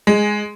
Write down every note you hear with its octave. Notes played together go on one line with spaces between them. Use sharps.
G#3